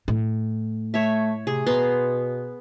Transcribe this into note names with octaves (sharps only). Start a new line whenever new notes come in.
A2
A3 C#5 E5
C3 G#4
B2 B3 A#5 C6